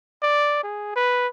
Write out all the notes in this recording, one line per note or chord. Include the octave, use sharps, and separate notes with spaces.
D5
G#4
B4